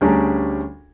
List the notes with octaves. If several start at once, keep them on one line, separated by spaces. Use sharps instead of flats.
D2 G3 C#4 D4 G#4 A#5